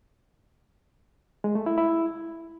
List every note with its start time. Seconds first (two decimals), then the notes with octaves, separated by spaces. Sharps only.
1.44 G#3
1.55 A3
1.66 E4
1.78 E4